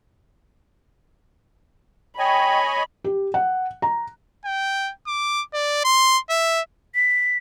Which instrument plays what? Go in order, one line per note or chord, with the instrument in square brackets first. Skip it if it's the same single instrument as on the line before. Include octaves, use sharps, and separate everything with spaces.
[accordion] C#5 D#5 G#5 [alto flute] G5 [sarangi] B5
[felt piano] G4
F#5
A#5
[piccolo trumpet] G5
D6
D5
C6
E5
[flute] B6